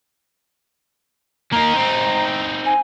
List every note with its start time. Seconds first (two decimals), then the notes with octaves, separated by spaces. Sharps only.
1.52 A#3 D#4 A#5
1.75 C4 D#4
2.66 G#5